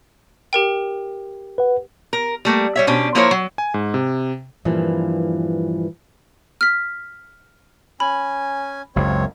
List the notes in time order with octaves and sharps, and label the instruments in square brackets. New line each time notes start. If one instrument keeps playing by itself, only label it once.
[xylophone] G4 A#4 G5
[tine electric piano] B4 F#5
[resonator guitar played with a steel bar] A#4
G3 A3 A#3
G3 C#5 E5
B2 C#4 D4 C5
F3 A#3 E4 A#4 C5 C#5
F#3
[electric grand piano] G#5
G#2
C3
[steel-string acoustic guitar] G2 A#2 E3 F3
[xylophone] F6 B6
[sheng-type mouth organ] C#4 G#5 [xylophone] B5
[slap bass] F#1 C#2 F#2 [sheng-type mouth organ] C4 C#5